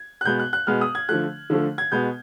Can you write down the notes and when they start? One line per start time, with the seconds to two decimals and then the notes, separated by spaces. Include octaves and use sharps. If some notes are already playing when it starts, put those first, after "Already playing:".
Already playing: G#6
0.21 F#6
0.25 B2 G#3 B3 G6
0.40 F#6
0.53 F#6
0.67 B2 G#3 B3 F6
0.81 D#6
0.95 G#6
1.09 D3 F3 A3 F#6
1.50 D3 F3 A3
1.78 G#6
1.92 B2 G#3 B3 G6